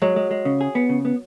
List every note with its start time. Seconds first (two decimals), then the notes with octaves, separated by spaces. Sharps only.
0.02 F#3 G#3
0.16 G#3
0.31 G#3
0.45 C#3
0.61 G#4
0.75 B3
0.89 C#3
1.05 B3